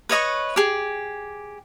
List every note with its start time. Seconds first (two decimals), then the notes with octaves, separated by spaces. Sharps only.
0.09 B4 C#5 D#5 C#6
0.56 G4 G#4